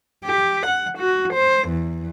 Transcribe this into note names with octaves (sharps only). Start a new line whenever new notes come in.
G4
F#5
F#4
C5
E2